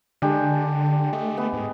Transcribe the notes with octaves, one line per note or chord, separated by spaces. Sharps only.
D3 G#3 D4 G4
A3 D#5
B3
G#2